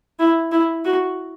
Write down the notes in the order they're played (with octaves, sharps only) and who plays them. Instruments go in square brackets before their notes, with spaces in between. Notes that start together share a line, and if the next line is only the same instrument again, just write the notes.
[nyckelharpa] E4
E4
F#4